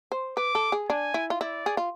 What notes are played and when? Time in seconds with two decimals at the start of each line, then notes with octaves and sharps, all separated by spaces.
0.12 C5
0.37 B4 D6
0.55 A4
0.72 G#4
0.89 D4 G#5
1.14 E4
1.30 F4
1.41 E4 D5
1.66 G#4
1.77 F4